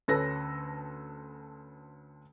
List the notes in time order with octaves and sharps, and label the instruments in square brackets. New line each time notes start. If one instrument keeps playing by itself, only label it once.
[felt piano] D2 C#4 A4 B4 A#6